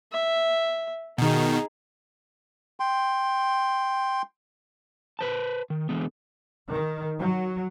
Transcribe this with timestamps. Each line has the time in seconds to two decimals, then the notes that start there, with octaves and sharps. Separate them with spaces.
0.12 E5
1.18 B2 D#3 D#4 G#4
2.80 G5 C6
5.19 B4 C5 A5
5.70 D#3
5.89 D3 E3 G#3 B3
6.69 D#3
7.20 F#3